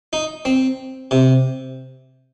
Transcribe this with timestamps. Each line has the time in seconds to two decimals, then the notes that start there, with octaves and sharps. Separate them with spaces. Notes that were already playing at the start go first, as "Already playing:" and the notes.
0.13 D#4
0.45 C4
1.11 C3